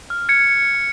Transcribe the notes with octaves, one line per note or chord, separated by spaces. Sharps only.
F6
G#6 C#7